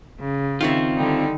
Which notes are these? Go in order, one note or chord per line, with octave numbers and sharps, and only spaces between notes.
C#3
D#3 C4 F4 C#5 E5
D3 G3 D#4